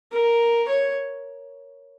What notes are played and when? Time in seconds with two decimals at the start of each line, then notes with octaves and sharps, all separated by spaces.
0.12 A#4
0.68 C#5